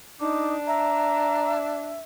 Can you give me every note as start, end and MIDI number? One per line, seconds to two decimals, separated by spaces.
0.20 2.00 62
0.20 0.54 63
0.20 0.52 86
0.67 2.02 76
0.67 1.52 82